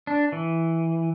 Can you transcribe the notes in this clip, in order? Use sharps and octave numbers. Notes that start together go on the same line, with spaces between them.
D4
E3